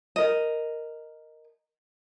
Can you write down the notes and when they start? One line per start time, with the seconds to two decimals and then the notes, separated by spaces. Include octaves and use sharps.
0.16 A#4 D#5